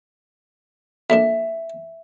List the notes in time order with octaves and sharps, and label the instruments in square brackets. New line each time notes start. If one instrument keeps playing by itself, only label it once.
[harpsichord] F2 A#2 D4 [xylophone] E5